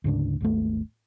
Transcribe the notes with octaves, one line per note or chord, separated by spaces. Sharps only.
D2 G#2 C#3 D4
G#1 D#2 A3